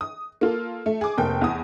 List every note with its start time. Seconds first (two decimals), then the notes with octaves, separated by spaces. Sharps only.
0.01 D#6
0.41 A#3 F4 A4
0.86 A3
1.01 G#4 D6
1.18 F1 A#3 G5
1.42 E2 D#6